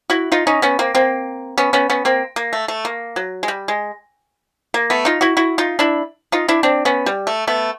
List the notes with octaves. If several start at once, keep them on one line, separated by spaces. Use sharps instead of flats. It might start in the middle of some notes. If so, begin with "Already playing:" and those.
E4 F#4
D#4 F4
C#4 D#4
B3 C#4
A#3 C4
A#3 C4
B3 C#4
B3 C#4
B3 C#4
A#3 C4
A#3
A3
A3
A#3
F#3
G#3
G3
G#3
A#3
A3 B3
D#4 F4
E4 F#4
E4 F#4
D#4 F4
D4 E4
D#4 F4
D4 E4
C4 D4
B3 C#4
G3
A3
A3 B3